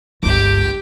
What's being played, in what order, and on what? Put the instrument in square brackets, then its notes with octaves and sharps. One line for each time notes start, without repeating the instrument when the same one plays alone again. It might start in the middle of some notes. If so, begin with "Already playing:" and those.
[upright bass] G1 G2 [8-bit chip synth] C#2 G6 [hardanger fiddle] G4 D6